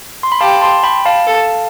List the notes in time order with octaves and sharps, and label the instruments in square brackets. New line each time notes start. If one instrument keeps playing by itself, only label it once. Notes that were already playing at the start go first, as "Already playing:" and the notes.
[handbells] C6
B5
[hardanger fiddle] G4 [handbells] F5 A5
[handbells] A5 C6
G5 B5
F5 A5
[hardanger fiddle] A4